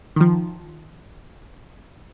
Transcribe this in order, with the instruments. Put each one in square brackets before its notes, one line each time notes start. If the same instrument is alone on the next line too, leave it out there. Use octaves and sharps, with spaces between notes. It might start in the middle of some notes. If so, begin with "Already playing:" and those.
[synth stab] D#3 F3